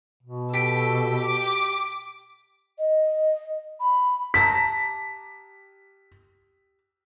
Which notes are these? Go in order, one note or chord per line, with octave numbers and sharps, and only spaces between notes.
B2
G4 A4 B6 D7
D6
D#5
B5
G4 A5 A#5 B6